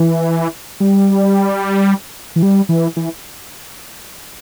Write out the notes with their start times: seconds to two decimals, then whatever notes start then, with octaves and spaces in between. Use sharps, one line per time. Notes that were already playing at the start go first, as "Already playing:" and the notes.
Already playing: E3
0.80 G3
2.36 E3
2.43 G3
2.69 E3
2.97 E3